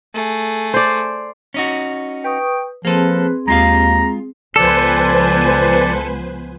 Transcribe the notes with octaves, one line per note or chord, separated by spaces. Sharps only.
A3 G#4
C5 D5
C#4 D#4 F#4
B4 G5 C#6 D#6
F3 A#3 C4 G#4 A4 B4
D#2 G#3 F4 F5 A#5
C#2 F3 B3 A4 B4 C5 D5 G#5